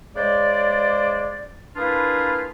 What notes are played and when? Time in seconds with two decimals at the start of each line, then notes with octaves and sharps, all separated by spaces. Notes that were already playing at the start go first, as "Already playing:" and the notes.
0.15 C#3 G#3 C5 D5
1.76 A#3 D4 E4 F4 G#4 B4